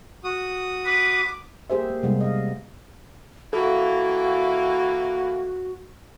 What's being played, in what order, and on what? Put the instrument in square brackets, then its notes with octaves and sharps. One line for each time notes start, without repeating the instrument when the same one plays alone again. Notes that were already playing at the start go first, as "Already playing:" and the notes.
[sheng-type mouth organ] F#4 D#6
[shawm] B4 [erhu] D6
[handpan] A#3 G4 G#4 C5 E5
A#3
C3 G3 G#3 B3
D#5 F5
[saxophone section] E3 A#3 [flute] F#4 [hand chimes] A4